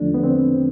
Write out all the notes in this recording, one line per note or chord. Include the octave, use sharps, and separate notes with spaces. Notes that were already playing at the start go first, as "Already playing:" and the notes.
Already playing: E2 D3 F3 A3 D4
B3
C4